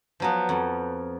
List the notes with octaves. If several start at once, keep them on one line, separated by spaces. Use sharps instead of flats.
F3 F#3 B3
F2